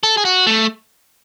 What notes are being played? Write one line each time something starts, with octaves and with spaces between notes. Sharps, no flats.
A4
G#4
F#4
A3